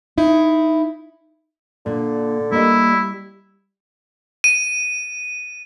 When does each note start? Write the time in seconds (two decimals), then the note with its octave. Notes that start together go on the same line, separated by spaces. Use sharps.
0.18 D#4 E4
1.86 A#2 D3 D4
2.52 G3 A#3 E4 D#5
4.44 D#7